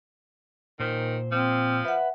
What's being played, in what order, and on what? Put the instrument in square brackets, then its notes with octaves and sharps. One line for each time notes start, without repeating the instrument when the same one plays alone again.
[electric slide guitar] A#2 C5 [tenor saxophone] D#3
[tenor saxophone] F3 [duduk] C4
[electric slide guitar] B4 [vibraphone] E5 F#5